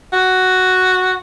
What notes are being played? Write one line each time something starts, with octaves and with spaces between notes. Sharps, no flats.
F#4